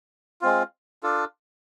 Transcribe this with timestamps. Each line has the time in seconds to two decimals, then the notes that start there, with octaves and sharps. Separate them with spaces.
0.42 G#3 C4 F4
1.03 D4 F4 A4